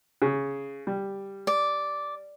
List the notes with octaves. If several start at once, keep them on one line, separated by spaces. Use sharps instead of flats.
C#3
G3
D5